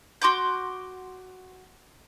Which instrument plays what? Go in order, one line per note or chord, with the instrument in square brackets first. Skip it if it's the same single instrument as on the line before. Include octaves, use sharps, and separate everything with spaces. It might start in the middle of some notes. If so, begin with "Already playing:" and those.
[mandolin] F#4 C6 D6 G6